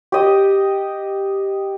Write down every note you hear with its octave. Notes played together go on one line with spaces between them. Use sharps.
G4 D#5